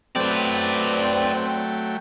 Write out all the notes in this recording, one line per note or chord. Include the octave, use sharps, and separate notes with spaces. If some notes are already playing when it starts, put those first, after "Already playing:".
F#3 A3 C4 B4 D5 G5